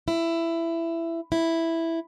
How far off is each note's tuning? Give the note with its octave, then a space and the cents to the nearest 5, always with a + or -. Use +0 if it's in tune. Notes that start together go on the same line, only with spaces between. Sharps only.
E4 +15
E4 +0